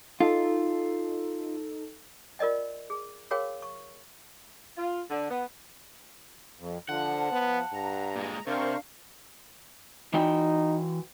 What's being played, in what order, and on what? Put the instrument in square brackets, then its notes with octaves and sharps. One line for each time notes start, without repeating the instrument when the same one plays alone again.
[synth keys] D#4 A4 [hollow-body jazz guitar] F4
[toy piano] F4 A#4 D5 D#5 G5
G#4
F#4 G#4 A#4 C#5 F5 G5
C#6
[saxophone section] F4
D3
B3
[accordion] F2
[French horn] D3 [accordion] F3 [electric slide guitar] F#5 [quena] A5
[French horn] B3
[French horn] G2 [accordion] A#5
[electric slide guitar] A#2 G#3
[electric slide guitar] C3 [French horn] D4 [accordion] A#4 C5 C#6 [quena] F5
[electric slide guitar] E3 F#4 G5 [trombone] D#4